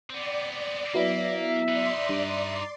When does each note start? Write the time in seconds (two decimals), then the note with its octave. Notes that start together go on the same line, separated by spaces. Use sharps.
0.10 B3 C4 D5
0.94 F#3 A#3 B3 E4 E5
1.68 D#4 B4 D5 C6
2.09 G2 D6